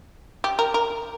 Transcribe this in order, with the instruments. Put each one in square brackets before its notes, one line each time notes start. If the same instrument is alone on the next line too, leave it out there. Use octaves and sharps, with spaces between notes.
[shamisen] G4
A#4
A#4